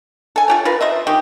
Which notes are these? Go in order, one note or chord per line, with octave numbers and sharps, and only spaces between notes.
A4 G#5
F4 G4 C#5
F4 A#4 B4
C5 D#5 E5
D#3 G4